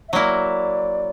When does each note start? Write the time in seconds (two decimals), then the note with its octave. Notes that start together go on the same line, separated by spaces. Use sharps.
0.09 E5
0.13 F#3 A#3 E4 D5